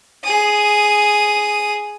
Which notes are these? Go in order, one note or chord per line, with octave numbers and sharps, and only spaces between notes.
G#4 D#6